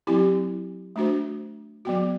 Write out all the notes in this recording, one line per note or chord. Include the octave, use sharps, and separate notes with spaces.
F#3 C4 E4 G4
A3 D4 F#4 C5
F#3 B3 F#4